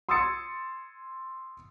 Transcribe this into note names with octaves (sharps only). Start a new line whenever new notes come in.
C6 D#6 E6 G#6 A6 C#7